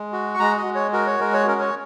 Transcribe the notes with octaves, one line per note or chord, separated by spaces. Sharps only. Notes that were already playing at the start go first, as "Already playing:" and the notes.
Already playing: G#3
F#4
C#6
G#3 A#5
D#5
G#3
C#5
F#4 A#4
C#5
G#3 A#4
C#5
C#4 A#4
C#5